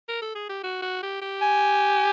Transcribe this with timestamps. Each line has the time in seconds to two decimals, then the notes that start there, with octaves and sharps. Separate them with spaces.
0.08 A#4
0.21 A4
0.35 G#4
0.49 G4
0.63 F#4
0.82 F#4
1.02 G4
1.22 G4
1.42 G#5